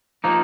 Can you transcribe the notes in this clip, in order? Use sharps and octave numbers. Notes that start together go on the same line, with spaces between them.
F3 A#3 D#4